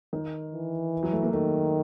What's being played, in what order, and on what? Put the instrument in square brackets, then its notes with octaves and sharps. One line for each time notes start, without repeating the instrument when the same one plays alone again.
[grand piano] D#3
[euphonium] E3
[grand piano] F#3
A3
A#3
[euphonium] D#3 [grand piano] A3